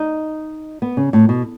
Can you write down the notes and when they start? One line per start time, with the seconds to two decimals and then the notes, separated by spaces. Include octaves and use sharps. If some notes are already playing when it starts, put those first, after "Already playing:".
Already playing: D#4
0.82 B3
0.97 C#3
1.13 A2
1.29 B2